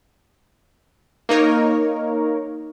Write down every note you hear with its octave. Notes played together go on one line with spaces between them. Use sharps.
A#3 D#4 A#4 C#5